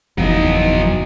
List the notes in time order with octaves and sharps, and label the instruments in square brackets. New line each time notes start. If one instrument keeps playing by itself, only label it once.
[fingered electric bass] F#1 E2 [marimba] F3 D#4 [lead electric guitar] F#3 D#5